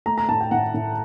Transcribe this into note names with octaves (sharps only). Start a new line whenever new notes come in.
A3 A#5
A#5
A2 A5
G5
A2 F#5
A2